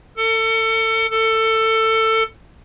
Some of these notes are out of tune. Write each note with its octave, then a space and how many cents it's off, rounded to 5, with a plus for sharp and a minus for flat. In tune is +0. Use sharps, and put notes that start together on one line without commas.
A4 +30
A4 +20